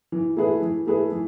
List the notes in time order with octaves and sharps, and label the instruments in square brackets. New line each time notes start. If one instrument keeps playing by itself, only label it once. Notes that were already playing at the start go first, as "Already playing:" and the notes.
[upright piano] E3
A3 E4 G#4 B4
E3
A3 E4 G#4 B4
E3